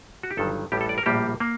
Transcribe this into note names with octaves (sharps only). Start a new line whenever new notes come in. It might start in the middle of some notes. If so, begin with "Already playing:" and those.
F#4
G4
G1 G2 D#3 F#3 A4
A1 A2 G3 G4
A4
D5
A#4
A#1 A2 G3 A#3 G4
A#3